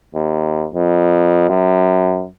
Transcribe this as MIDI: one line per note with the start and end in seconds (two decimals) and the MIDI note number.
0.15 0.66 39
0.74 1.48 41
1.49 2.26 42